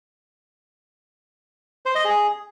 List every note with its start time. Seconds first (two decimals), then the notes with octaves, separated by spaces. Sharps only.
1.86 C5
1.95 D#5
2.05 G#4